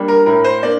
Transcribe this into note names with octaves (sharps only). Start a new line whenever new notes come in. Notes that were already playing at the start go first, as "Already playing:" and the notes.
Already playing: G3 A#3 D4
A#4
A2 A#4
C5
A#3 D4 D5